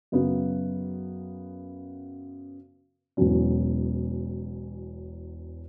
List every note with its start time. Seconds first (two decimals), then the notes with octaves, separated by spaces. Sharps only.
0.12 F#2 C#3 F#3 B3
3.17 E1 E2 B2 F#3 C#4